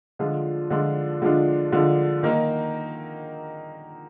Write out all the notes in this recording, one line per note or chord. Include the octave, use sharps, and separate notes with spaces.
D3 F3 G#3 D4 F4
D3 F3 G#3 D4 F4
D3 F3 G#3 D4 F4
D3 F3 G#3 D4 F4
D#3 A#3 D#4 A#4